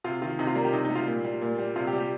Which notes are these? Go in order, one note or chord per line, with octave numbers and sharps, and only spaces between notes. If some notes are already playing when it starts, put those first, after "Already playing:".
C3 F4
D#3 F4
C3 D#4
F4
G3 A#4
G4
C3 D#4
D#4
G3
F4
A#2
G3
A#2
G3
C3 F4
G4
G3
G4